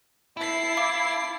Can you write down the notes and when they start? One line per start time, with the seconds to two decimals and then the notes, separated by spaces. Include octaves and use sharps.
0.37 E4 A5 C7
0.77 F5 D6